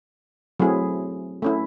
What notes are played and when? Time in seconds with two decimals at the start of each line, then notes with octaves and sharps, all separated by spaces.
0.60 F#3 A3 C4 E4 G#4
1.42 A3 C#4 E4